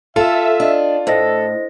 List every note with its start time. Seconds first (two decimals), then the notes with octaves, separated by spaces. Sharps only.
0.16 F4 A4 E5
0.60 D4 D#5
1.07 A2 A4 C5 D#5 A#6